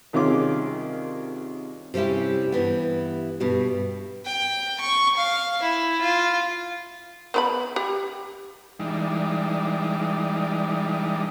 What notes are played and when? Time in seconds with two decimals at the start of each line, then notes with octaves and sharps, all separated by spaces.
0.13 C2 D#3 C#4 F4 G#4 D6
1.94 C3 G3 C#4 E4 G4
2.52 G2 E3 B3
3.40 G2 B2 G3
4.26 G5
4.81 C#6
5.17 F5
5.63 E4
6.01 F4
7.34 B3 B4 B5
7.76 G4
8.80 E3 G3 G#3 D4 D#4